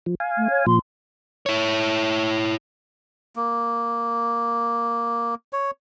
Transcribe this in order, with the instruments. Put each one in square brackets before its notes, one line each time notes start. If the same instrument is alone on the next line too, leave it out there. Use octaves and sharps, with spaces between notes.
[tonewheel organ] F3
F5 G#5
[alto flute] A3
C#5
[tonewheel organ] A#2 F3 [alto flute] C6
[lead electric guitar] E4 C#5
[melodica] A#3
C#5